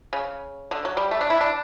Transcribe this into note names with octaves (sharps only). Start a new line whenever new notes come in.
C#3
D3
F#3
G3
A3
D4
E4
D4